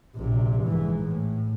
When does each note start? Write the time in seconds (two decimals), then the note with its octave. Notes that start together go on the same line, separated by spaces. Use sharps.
0.16 A#1 C3
0.63 G#2 E3
1.00 A2